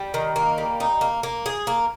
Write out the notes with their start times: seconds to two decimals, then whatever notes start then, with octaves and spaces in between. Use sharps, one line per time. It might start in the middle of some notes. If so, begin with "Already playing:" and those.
Already playing: G3
0.14 D#3
0.36 A#3
0.58 G3
0.80 D#4
1.01 A#3
1.23 A#3
1.46 G#4
1.67 A#3